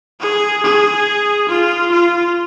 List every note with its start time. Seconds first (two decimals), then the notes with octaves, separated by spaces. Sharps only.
0.20 G#4
0.63 G#4
1.49 F4
1.91 F4